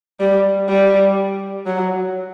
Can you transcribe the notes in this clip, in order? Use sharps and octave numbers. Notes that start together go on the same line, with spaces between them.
G3
G3
F#3